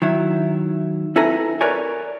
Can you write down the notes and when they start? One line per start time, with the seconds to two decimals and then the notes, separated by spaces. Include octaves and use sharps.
0.02 D#3 F#3 E4
1.16 C4 E4 A4 B4 G#5 A#5
1.61 A#4 B4 C#5 D5 G#5